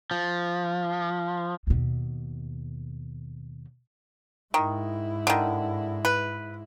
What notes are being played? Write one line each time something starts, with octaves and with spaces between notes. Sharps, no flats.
F3
D#2 B2
G#2 D#3 E4
D3 D#3
B4